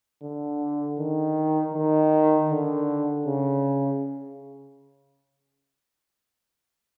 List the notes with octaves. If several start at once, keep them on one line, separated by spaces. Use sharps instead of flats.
D3
D#3
D#3
D3
C#3